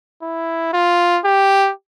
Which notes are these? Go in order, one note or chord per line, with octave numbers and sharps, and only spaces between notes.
E4
F4
G4